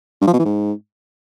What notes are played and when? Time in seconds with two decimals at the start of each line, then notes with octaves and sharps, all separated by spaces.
0.21 G2
0.27 F3
0.33 B2
0.39 E3
0.45 G#2